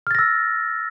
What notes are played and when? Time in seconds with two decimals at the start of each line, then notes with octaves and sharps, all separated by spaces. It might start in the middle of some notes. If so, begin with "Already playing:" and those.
0.07 F6
0.11 A6
0.15 A#6
0.19 E6